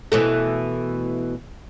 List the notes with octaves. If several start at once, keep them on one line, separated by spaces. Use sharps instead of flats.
B2 E3 A3